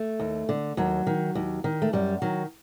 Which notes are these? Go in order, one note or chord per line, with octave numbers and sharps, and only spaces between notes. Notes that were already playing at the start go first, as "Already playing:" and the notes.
Already playing: A3
D#2
D3
D#2 F#3
D#3
D#2
D#3
A3
F#2 G3
D#3 F#3